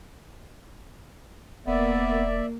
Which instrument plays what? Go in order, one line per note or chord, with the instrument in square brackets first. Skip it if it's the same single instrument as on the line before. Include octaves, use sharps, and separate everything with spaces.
[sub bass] E1 [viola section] A#3 [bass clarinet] B3 [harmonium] D5 E5